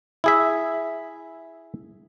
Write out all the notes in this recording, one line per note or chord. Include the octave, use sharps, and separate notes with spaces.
E4 G#4 E5